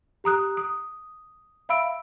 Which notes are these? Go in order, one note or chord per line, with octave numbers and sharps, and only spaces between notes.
G4 A#5 D#6 F#6
D#6
E5 F5 B5 E6 D7